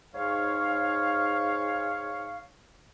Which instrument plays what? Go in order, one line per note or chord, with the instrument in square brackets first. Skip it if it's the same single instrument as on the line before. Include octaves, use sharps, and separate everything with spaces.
[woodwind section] G#2 C#5 F5